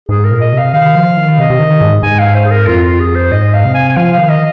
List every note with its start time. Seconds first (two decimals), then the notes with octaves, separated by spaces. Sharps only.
0.09 G#2 G#4
0.25 A#4
0.31 A#2
0.41 D#5
0.53 C3
0.58 F5
0.73 D#3 F5
0.95 F3
1.17 D#3
1.38 C3 D#5
1.50 C3
1.59 D#3
1.81 G#2
2.03 G#2 G#5
2.19 F5
2.35 C5
2.45 G#4
2.51 A#4
2.67 F2 F4
2.83 F4
3.00 G#4
3.15 C5
3.31 G#2 D#5
3.54 F5
3.64 C3
3.74 G#5
3.89 G#5
3.96 F3 F5
4.13 D#3 F5
4.29 D#5